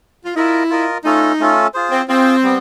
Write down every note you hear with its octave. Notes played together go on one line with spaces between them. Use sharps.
F4
E4 F4 A#4 D#5
F4 A#4 D#5
A3 C#4 D#4 F4 A4
A3 C#4 F4 A4
F4 G#4 C5
C4
C4 F4 G#4 C5
G3 B3